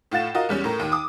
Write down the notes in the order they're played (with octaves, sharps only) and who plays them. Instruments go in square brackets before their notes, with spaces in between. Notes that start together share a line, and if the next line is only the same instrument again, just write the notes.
[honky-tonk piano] A2 F4 F#5 A6 E7
F4 F#4 A#4 D#5
E2 G3 C#4
A2 A#4
D#2
D6 D#6